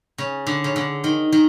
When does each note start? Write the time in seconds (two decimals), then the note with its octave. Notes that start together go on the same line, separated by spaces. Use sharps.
0.18 C#3
0.47 D3
0.64 C#3
0.76 D3
1.04 D#3
1.32 D#3